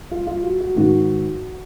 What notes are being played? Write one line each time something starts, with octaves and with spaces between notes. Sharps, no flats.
F4
F4
F#4
F#4
G#2 D#3 F#4